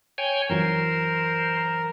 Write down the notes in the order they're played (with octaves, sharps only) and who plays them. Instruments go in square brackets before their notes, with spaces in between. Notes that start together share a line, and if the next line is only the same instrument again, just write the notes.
[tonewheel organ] C#5 G5 G#5
[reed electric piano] F#2 E3 F#3 [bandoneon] A#4 [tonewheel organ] C5